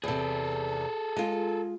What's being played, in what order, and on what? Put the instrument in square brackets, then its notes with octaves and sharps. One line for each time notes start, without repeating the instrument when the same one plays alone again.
[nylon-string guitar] E2 C3 [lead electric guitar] G#4 A4
[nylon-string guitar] G#3 F4